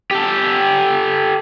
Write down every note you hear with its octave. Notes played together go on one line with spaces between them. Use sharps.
G4 A4